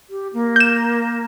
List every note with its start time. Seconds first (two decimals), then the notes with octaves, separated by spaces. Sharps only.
0.10 G4
0.33 A#3
0.56 G6 E7